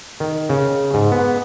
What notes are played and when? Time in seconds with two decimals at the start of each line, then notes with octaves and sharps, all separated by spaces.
0.20 D#3
0.50 C#3
0.94 G#2
1.12 B3